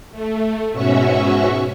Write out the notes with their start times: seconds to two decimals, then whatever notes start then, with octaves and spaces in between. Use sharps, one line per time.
0.12 A3
0.72 G#2 B2 C#4 F#4 E5 C#6